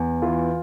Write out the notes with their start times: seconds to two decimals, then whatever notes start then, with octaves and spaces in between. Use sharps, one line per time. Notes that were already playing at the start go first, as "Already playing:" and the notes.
Already playing: E2
0.22 E3 F4